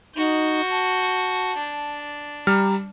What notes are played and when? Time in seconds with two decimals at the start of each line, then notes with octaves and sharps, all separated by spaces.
0.16 D#4 F#4 G6
0.71 A5
1.58 D4
2.47 G3 A#5 F6